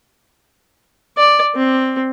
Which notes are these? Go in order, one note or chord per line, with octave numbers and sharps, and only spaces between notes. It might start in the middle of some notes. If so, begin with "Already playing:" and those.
D5
C4